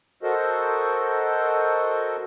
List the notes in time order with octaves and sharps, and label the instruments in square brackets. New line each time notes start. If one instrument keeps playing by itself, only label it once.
[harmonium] F#4 A4 A#4 C5 D#5